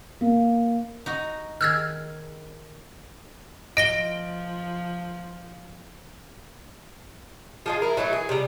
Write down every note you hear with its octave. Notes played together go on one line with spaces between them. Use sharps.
A#3
D#4 F#4 D#5
D#3 G#4 E6 F6 G#6
F3 D#5 A#6 D7 G7
F3 G#3 F4
E4 A#4
E3 F#3 A3 D#4
G#4
C3 G3